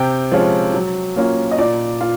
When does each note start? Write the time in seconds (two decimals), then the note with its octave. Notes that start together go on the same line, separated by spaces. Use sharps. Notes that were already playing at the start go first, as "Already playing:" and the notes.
Already playing: C3 G5
0.32 F3 G#3 C#4 F4
0.74 F#3
1.16 A#3 C#4 F4
1.51 D#5
1.58 A#2 D5
2.01 F4